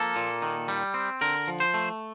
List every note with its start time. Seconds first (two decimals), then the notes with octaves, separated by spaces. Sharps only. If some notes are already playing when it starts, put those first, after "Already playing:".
Already playing: F3 A#3 A4
0.16 A#2
0.42 D#3
0.68 G3
0.94 C4
1.21 D3 A#4
1.48 F3
1.60 C5
1.74 A3